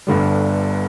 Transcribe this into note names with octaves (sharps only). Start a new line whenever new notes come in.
G1 G2 D3 G3